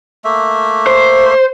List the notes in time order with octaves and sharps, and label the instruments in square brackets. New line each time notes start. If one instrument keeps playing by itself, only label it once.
[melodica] A3 A#3 E5
[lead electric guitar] C5